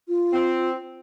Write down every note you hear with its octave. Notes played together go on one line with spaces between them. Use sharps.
F4
C4